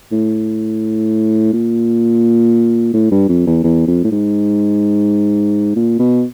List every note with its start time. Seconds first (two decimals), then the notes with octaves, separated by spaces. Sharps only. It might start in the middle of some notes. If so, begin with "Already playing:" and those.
0.12 A2
1.53 A#2
2.94 A2
3.11 G2
3.29 F2
3.47 E2
3.64 E2
3.87 F2
4.04 A2
4.12 G#2
5.76 A#2
5.99 B2